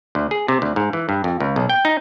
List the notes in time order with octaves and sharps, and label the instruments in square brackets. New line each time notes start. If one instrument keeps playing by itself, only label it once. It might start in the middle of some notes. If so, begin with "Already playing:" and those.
[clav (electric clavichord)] D2
G#4
C3
D2
G#2
E3
G2
F2
C#2
B1
G5
D#4